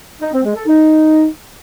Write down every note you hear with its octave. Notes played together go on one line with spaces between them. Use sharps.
D#4
C4
G#3
A4
D#4